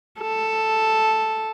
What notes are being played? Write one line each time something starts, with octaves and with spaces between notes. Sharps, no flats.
A4